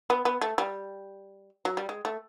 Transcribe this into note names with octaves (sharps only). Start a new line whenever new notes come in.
B3
B3
A3
G3
F#3
G3
G#3
A3